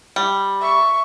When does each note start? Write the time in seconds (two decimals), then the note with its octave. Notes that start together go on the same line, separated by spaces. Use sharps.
0.16 G3
0.60 E5 C#6